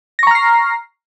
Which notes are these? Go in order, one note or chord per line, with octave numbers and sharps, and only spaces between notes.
A#5 C#6 F6 A#6 C7